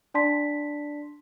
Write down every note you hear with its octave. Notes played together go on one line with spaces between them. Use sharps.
D4 D5 A5 C6 B6